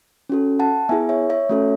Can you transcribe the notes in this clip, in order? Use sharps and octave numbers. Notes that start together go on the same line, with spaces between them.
C#4 F#4 A4
F#5 A5
B3 E4 G#4 E5 G#5
C#5 E5
C#5 E5
A3 C#4 F#4 A4